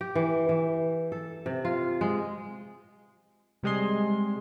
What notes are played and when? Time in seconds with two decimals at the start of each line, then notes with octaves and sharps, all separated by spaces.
0.01 G4
0.15 E3
0.49 E3
1.12 A4
1.46 C3
1.65 F4
2.01 G#3
3.63 C3 G3 G#3 G#4 C6